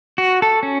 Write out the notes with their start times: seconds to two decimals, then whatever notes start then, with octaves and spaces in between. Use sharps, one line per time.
0.18 F#4
0.42 A4
0.63 C#4